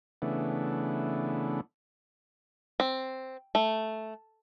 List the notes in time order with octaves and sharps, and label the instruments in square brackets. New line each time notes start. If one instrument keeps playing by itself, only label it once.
[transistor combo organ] C#3 E3 A3 B3 D4
[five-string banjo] C4
A3